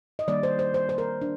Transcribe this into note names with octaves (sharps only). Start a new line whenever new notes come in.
D#5
D#3 G3 A#3 D4 D5
C5
C5
C5
C5
A#4
D4